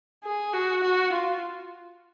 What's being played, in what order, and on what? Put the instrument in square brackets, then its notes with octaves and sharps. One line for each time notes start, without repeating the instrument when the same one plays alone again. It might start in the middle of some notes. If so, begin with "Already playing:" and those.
[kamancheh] G#4
F#4
F#4
F4